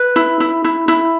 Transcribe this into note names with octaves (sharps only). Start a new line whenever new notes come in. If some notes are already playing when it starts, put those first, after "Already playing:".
Already playing: B4
E4
E4
E4
E4